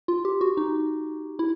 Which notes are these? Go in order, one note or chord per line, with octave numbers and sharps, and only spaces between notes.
F4
G4
F#4
D#4
E4